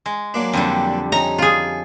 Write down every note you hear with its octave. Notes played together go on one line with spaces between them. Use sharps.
G#3
F#3 A#3 D4
F2 D3 G3
C#4 D#4 A#5
F4 G#4